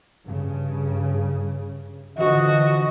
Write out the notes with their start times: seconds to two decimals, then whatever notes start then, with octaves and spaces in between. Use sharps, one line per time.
0.25 G2 C#3
2.19 D3 E3 F3 F#4 D#5